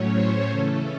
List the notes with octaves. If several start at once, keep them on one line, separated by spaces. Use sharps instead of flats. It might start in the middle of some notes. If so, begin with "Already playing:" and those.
Already playing: A2 F#3 A3 C#4 C#5
C5
C#3 E3 A3 C#4 A4